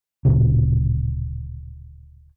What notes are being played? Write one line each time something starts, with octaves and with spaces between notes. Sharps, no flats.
D1 B1 A#2 C#3